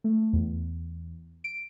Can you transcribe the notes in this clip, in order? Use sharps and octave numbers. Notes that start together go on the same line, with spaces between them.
A3
E2
D7